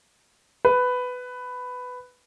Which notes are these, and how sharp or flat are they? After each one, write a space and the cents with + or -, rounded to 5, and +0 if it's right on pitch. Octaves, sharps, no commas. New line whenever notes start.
B4 +10